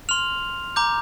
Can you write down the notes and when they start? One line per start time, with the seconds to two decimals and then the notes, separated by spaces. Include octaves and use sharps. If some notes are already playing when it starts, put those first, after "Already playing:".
0.09 C6 F6 F7
0.76 A#5 D6 G6